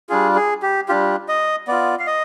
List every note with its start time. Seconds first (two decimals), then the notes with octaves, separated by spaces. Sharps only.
0.09 G3 D4 F4 G#4
0.36 G#4
0.62 G4
0.88 G3 D4 F4 G4
1.28 D#5
1.68 B3 F4 D5
1.99 F5
2.07 D#5